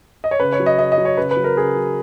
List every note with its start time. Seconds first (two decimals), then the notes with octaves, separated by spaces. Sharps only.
0.24 D#5
0.31 C#5
0.40 C#3 B4
0.53 C#5
0.60 F#3
0.66 D#5
0.79 C#3 D#5
0.92 D#5
0.98 F#3
1.05 C#5
1.17 C#3 B4
1.31 B4
1.36 F#3
1.44 A#4
1.56 C#3 G#4
1.76 F#3